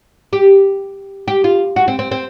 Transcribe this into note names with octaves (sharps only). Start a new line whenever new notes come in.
G4
G4
F4
F#4
C4
C4
C4